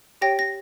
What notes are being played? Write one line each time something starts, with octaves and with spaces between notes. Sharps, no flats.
G4 C#5 G5 A#6
A#6